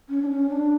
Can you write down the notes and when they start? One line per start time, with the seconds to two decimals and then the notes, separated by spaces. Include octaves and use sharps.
0.09 C#4
0.22 D4
0.29 C#4
0.50 D4